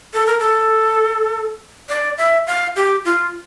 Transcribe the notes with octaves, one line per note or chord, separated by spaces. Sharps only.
A4
A#4
A4
D5
E5
F5
G4
F4